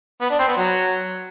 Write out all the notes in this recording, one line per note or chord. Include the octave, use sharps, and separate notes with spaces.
B3
D4
C4
B3
F#3